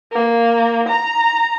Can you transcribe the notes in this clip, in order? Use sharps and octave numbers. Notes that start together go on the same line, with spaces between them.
A#3
A#5